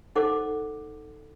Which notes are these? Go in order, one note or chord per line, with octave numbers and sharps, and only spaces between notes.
D#4 A4 C5 F#5 D6